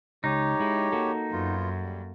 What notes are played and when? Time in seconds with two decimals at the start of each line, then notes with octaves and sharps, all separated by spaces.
0.24 C#2 D#4 G4 C#5
0.60 G#3 E4
0.92 A#3 F#4 A4
1.32 F#2 B3 F4
1.82 G3